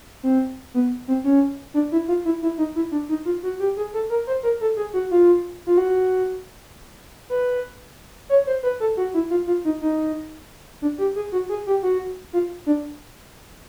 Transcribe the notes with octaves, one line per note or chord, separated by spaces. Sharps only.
C4
B3
C4
C#4
D4
E4
F4
E4
E4
D#4
E4
D4
D#4
F4
F#4
G4
G#4
A4
A#4
C5
A#4
A4
G#4
F#4
F4
F4
F#4
B4
C#5
C5
B4
A4
F#4
E4
F4
F4
D#4
D#4
D4
G4
G#4
F#4
G#4
G4
F#4
F4
D4